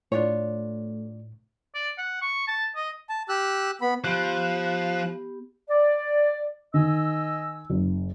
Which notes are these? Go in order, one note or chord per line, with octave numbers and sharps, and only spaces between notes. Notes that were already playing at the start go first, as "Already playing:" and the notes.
A2 A3 D4 F4 C#5
D5
F#5
C#6
A5
D#5
A5
G4 E6 F#6
B3 B5
F3 B3 G4 F#6
D5
D#3 D#5 G#5 E6
F#1